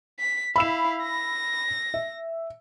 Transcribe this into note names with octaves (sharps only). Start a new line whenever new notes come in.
B6
E4 F5 B5 E6 E7
A#6
E5